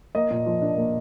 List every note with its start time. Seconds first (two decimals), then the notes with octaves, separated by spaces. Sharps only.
0.15 A#3 D#5
0.30 A#2
0.46 F3
0.62 D4
0.77 A#3